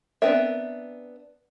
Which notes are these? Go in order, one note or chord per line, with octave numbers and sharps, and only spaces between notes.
B3 C4 D4 A#4 E5